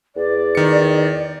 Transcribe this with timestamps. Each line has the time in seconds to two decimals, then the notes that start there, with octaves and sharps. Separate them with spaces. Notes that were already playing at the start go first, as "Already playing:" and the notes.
0.16 E2 D5
0.55 D#3 C#7